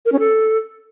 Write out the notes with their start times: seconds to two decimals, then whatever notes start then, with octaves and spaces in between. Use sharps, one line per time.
0.05 A#4
0.12 C#4
0.19 A4